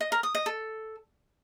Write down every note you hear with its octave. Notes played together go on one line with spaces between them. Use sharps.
D#5
A#4
D#6
D#5
A4